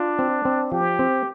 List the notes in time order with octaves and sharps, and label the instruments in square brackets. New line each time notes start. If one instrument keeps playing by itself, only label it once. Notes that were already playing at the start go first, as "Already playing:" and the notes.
Already playing: [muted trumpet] D4 [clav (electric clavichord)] F4
[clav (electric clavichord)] C4
C4
[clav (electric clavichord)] F3 [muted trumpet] G4
[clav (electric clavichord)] C4